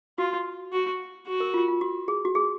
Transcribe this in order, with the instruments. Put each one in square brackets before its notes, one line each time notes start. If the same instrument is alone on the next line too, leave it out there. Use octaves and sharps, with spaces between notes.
[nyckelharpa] F4 [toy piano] F#4
[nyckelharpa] F#4
F#4
[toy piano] A#4
F4
F4
F#4
G#4
F#4
G#4